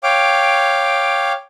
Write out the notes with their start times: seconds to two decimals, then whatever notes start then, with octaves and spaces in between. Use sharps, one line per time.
0.03 C#5 F5 G5 D6